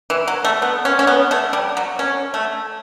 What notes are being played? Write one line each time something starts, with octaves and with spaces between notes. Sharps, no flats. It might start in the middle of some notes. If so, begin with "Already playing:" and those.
E3
F#3
A3
B3
C#4
C#4
B3
A3
G3
F#3
C#4
A3